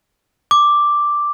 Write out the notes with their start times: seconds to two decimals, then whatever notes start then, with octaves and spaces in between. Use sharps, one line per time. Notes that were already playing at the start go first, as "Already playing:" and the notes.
0.51 D6